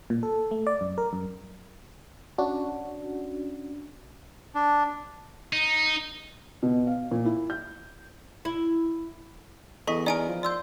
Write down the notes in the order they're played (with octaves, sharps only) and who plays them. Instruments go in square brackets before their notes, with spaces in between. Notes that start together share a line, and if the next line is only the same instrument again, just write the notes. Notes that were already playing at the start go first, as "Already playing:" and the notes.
[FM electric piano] A#2
A4
A3
D5
F#2
A#4
F#2
C#4 D4 F#4
[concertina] D4
[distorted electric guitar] D#4
[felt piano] B2
F5
A#2
E4
G6
[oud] E4
[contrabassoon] E2 [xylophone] A4 C#6 B6 [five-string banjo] D#5
[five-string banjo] D#4 A#4 [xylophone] D5 G#5 D7
[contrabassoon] F3
[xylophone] D5 E6 G6 [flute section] C6